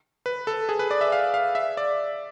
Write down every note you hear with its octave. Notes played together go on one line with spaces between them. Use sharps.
B4
A4
G#4
B4
D5
E5
F5
F5
E5
D5